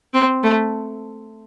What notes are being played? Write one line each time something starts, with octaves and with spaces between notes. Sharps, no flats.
C4
A3